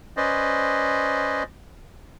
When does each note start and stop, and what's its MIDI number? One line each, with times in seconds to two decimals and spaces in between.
0.17 1.43 61
0.17 1.43 71
0.17 1.43 72
0.17 1.43 74
0.17 1.43 75